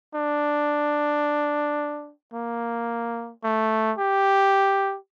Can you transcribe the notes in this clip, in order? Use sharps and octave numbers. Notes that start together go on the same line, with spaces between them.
D4
A#3
A3
G4